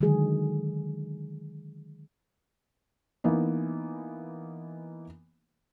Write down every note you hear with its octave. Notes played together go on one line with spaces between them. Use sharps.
D3 D#3 F#3 G#3 G#4
E3 A#3 B3 D#4